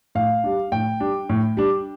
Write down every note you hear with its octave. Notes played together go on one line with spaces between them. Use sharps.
A2 F5
G3 D4
A2 G5
G3 D4
A2
G3 D4